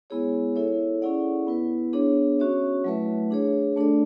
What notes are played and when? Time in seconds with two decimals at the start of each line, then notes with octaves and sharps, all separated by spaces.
0.10 G#3 B3 E4 G#4 C#5
0.56 E4 A4 C#5 E5
1.02 C#4 E4 G#4 D5 F#5
1.47 B3 E4 B4
1.93 B3 D4 G#4 C#5
2.39 C#4 F#4 C#5 E5
2.84 F#3 A3 E4 B4 E5
3.31 D4 G#4 C#5
3.76 A3 D4 A4 D5